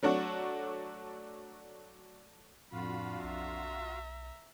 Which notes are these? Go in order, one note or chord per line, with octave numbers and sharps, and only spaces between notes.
F#3 A3 D4 F#4
F2 A2 D4 F4 F#4 F5 B5
B1 E5 A#5